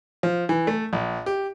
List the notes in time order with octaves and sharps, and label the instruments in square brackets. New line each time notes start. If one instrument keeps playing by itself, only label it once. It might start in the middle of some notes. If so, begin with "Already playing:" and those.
[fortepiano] F3
E3
A3
A#1
G4